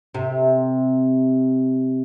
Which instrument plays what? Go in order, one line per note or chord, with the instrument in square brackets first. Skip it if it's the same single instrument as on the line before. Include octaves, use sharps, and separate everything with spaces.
[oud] C3